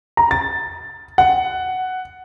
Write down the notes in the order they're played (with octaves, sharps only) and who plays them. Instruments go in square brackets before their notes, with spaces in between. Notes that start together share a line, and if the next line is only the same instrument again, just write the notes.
[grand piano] A#5
A6
F#5